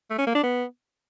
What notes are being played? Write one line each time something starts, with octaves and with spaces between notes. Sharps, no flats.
A3
C#4
A#3
D4
B3